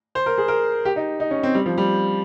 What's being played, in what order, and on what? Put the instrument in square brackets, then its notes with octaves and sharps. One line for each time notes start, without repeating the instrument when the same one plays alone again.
[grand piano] C5
A#4
G#4
A#4
G4
D#4
D#4
C#4
C4
G3
F3
G3